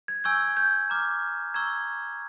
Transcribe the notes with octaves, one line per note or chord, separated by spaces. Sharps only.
G#6
G#5 C#6 E6 G6 G#6
G6
A#5 D6 F6
A#5 C#6 E6 G6 G#6